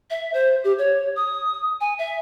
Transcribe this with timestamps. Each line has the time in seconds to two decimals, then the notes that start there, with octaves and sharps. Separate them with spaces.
0.10 E5
0.34 C5
0.64 G4
0.79 C#5
1.16 D#6
1.81 G#5
1.99 E5